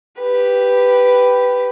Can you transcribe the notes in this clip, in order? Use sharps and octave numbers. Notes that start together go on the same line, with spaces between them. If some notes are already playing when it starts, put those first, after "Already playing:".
G4 B4